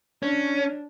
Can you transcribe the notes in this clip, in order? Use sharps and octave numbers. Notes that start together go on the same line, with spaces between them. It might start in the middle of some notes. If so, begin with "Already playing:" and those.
C#4 D4